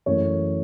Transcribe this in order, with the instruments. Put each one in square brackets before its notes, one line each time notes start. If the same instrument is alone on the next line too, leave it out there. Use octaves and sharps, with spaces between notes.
[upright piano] F#2 E3 A3 C#5